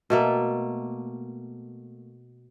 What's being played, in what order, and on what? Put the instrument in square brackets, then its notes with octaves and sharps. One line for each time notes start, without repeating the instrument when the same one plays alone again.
[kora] B2 A3 A#3